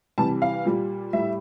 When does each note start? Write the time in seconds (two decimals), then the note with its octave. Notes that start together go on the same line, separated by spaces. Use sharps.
0.18 C3 E3 G3 A5
0.42 F5
0.65 A#2 G3
1.13 A2 G3 E5